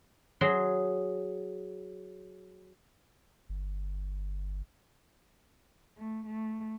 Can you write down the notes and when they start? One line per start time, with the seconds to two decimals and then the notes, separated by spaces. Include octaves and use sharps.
0.41 F#3 G#4 C6
3.49 G1
5.97 A3
6.26 A3